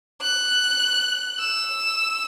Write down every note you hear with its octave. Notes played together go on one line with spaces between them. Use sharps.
F#6
E6